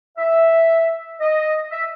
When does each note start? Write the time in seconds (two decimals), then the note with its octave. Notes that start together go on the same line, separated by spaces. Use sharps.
0.18 E5
1.20 D#5
1.71 E5